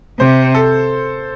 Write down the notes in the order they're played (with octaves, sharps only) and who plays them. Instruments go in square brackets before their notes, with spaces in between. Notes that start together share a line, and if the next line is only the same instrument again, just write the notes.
[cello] C3 [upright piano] C5
[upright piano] A4